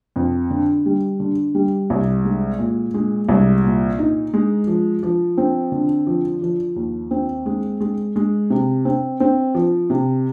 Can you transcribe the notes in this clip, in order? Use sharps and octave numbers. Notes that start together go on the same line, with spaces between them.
F2
D3
G3
D3
G3
C2
G#3
A#2
G#3
C2
A#2
D#4
G#3
F3
F3
C4
D3
F3
F3
D#2
C4
G#3
G#3
G#3
C3
C4
C4
F3
C3